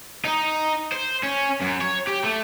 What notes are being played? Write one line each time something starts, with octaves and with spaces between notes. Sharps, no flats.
D#4
C5
C#4
F#2
C#5
G4
A3